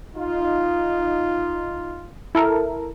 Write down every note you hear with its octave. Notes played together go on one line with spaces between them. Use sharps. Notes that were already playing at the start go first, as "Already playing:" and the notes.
D#4 F4
E4 A4 A#4